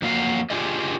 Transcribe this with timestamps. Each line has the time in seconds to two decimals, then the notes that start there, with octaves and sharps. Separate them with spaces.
0.02 F2 F#3 A#3 F#4 F5
0.50 D4 F4 G4 G#4 D5 D#5